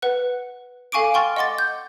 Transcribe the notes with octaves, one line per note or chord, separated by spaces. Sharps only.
B4 F#5 F#6
A4 F5 G#5 C#6 D6 D7
G5 C6 C#6 F6 A6
D#5 F#5 C6 D6 A6
G6